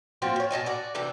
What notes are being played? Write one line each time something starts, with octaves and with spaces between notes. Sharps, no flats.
F3 A#3 C4 F#4
F3 C#5
B2 A4 D#5 G#5
F#4 D5
C3 E3 D4 A4